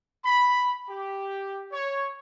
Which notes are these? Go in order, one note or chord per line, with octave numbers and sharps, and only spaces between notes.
B5
G4
C#5